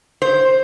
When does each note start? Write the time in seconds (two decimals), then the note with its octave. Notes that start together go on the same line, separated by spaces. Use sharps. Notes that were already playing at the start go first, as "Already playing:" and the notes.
0.22 C5